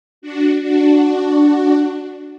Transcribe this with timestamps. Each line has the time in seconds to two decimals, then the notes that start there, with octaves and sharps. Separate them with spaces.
0.22 D4 F#4
0.62 D4 F#4